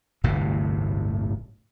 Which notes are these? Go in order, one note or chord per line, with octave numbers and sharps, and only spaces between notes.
D1 G1 A2 C3